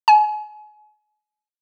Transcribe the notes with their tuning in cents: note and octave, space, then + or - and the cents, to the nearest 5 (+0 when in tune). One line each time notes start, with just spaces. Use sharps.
G#5 +35